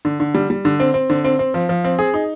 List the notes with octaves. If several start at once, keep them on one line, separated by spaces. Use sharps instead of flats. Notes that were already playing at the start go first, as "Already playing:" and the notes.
D3
D3
G3
G3
D3
C4
C4
D3
C4
C4
F3
F3
C4
G#4
D#4